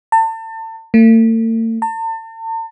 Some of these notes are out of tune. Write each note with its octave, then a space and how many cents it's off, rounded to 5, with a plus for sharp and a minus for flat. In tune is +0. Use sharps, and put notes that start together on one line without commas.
A5 +35
A3 +45
A5 +40